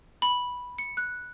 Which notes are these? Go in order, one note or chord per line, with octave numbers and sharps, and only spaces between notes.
B5
C#7
F#6